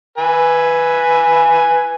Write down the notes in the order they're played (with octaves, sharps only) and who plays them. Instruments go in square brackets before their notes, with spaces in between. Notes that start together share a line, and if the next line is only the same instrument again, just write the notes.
[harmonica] B4 G#5